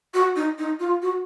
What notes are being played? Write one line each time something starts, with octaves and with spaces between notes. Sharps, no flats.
F#4
D#4
D#4
F4
F#4